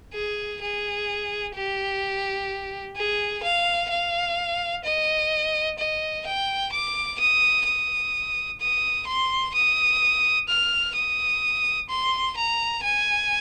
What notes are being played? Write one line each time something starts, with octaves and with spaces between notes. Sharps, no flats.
G#4
G#4
G4
G#4
F5
F5
D#5
D#5
G5
D6
D#6
D#6
D#6
C6
D#6
F6
D#6
C6
A#5
G#5